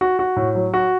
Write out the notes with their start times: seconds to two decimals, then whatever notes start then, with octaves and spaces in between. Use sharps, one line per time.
0.01 F#4
0.19 F#4
0.36 A2
0.55 F#3
0.74 F#4